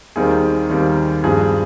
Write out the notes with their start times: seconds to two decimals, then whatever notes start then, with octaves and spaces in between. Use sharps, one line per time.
0.16 D#2 D#3 G3 C4 G#4
0.70 D#2 D#3 G3 C4
1.23 G2 F3 C4 G#4